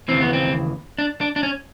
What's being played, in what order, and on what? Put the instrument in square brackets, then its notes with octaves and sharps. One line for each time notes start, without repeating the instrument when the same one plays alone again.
[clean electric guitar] D#2 C#3 E3 C4
B3
C4
D4
D4
D4
C#4